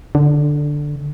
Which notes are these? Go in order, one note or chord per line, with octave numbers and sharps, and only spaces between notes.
D3